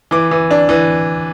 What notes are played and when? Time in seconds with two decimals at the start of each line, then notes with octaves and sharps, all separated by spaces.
0.11 E3 D6
0.31 E3
0.51 D4
0.69 E3